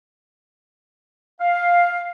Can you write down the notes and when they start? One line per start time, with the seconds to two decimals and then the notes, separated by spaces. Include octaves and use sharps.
1.40 F5